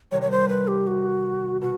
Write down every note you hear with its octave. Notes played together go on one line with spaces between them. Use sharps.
E2 C3 D#3 G3 C#5
C#5
C5
B4
G4
F#4
B2 F#4